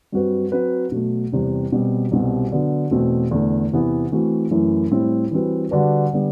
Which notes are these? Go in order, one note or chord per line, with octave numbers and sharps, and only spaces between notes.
G2 F#3 C4 F#4 B4
F#3 C4 F#4 B4
B2 F#3 A3
E2 C3 G3 C4
B2 G3 C4
C2 B2 G3 C4
D3 F#3 B3
E2 B2 A3 C4 F#4
E2 D3 A3
E2 C3 E3 B3 E4
E3 A3 C4 F#4
F#2 E3 A3 E4
A2 G3 C4 E4
E3 G3 C4 F#4 B4
D3 G3 D4 F#4 B4
D3 G3 B3